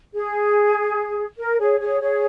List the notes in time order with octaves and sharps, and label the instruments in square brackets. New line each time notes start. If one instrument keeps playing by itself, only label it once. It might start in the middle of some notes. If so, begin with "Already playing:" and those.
[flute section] G#4
A#4
G#4 C#5
G#4 C#5
G#4 C#5